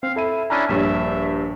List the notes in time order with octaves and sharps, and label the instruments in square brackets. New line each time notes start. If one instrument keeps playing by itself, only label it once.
[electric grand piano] C4 [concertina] F5
[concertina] E4 [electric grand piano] A4 E5 D#7
[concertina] C#4 D4 E4 [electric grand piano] A#5 F#6 D#7
[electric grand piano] A#1 G2 C#5 [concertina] E5